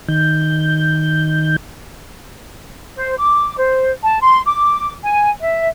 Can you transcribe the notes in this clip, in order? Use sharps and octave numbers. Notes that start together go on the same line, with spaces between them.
D#3 G6
C5
D6
C5
A5
C6
D6
G#5
E5